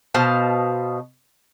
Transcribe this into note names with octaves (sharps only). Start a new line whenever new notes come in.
B2 C5 F5 A5